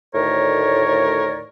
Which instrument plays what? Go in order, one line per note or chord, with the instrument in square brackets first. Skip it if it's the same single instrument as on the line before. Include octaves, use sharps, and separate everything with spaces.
[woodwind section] D2 A2 D#3 A#4 C#5 D5